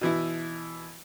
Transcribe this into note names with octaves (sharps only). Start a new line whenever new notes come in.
B2 E3 E4